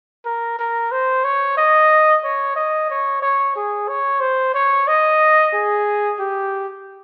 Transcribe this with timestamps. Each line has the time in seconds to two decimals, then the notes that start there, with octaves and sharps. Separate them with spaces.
0.26 A#4
0.59 A#4
0.92 C5
1.24 C#5
1.57 D#5
2.24 C#5
2.56 D#5
2.90 C#5
3.22 C#5
3.56 G#4
3.89 C#5
4.21 C5
4.55 C#5
4.88 D#5
5.54 G#4
6.20 G4